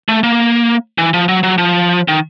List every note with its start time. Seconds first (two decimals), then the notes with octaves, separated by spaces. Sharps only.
0.09 A3
0.23 A#3
0.98 E3
1.13 F3
1.28 F#3
1.43 F#3
1.58 F3
2.08 D#3